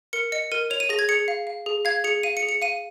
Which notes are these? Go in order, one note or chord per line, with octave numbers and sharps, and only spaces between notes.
A#4 C#7
D#5 C#7
A#4 D#7
C#5 F7
D#7
G#4 A#6
G#6
G#4 C#7
F5
F5
G#4
F5 G#6
G#4 C#7
F5 D#7
C#7
G#4
C#7
F5 D#7